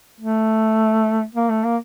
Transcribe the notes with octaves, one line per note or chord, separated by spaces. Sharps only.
A3
A#3
A3
A#3